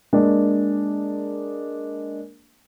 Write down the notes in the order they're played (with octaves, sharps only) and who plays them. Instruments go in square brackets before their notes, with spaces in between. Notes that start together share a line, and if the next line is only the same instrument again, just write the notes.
[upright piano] G#3 A#3 D4